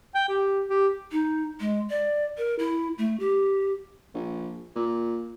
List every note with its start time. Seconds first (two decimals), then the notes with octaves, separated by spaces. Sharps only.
0.15 G5
0.29 G4
0.70 G4
1.12 D#4
1.60 G#3
1.90 D5
2.38 A#4
2.59 E4
2.98 A3
3.20 G4
4.14 A#1
4.75 A#2